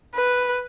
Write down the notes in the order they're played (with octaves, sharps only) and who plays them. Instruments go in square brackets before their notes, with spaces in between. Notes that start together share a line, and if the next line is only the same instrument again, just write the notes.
[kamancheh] B4